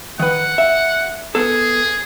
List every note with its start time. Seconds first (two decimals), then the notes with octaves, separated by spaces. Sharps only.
0.20 D#3 B4 F#5
0.58 E5
1.35 B3 G#4 A4